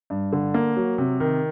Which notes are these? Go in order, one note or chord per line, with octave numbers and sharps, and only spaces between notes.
G2
D3
A#3
F#3
C3
D#3